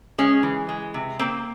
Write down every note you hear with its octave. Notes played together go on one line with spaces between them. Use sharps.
G#3 C#4
E3
G#3
C3
A#3 C4